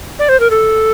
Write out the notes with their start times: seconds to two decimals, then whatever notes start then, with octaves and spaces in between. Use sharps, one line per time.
0.19 D5
0.29 C5
0.40 A#4
0.51 A4